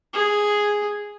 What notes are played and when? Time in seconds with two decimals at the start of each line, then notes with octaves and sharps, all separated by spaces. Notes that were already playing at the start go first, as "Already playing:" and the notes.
0.14 G#4